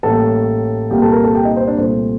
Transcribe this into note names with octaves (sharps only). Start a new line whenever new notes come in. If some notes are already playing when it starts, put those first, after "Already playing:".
A1 A2 G3 A#3 A4 A5
C2 A#2 G3 A#3 G4 G5
A4 A5
A#4 A#5
A4 A5
G4 G5
D#4 D#5
C5
D4 D5
C2 A#2 A3 C5